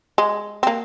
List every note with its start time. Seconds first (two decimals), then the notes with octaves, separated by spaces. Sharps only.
0.18 G#3
0.63 C4
0.67 A#3